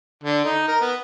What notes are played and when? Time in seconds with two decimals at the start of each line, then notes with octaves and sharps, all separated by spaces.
0.24 D3
0.45 D#4
0.68 A#4
0.81 B3